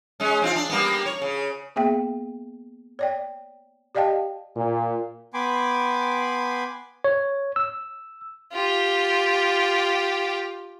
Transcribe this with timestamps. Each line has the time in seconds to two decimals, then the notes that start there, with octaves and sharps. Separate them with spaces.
0.20 G#3 C#4
0.42 C4 E4 F4
0.56 D4
0.70 G3 A#3 B3
1.06 C#5
1.22 C#3
1.76 A#3 B3 G#4 E5 G5
2.99 C#5 D5 G5
3.95 G4 D5 D#5 F5 G5 A5
4.54 A#2
5.34 B3 G5 G#5 B5 C6 D6
7.04 C#5
7.56 E6
8.53 F4 G4